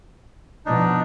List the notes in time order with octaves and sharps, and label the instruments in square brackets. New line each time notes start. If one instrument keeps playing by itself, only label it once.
[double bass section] B2 F3 [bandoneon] D4 D#4